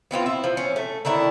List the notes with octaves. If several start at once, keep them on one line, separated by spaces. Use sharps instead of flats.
B3 C4 E4 F4
E4
F3
C#4
A3
D3 D#3 D4 E4